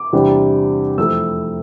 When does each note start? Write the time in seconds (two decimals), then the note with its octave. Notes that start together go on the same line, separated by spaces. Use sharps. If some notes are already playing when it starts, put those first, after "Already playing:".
Already playing: D6
0.13 E2 C3 G3 D4
0.98 F2 E3 A3 C4 E6